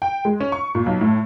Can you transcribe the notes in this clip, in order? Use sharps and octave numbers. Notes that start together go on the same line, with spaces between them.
G5
G#3
C#4
C#6
A#2
B1
A2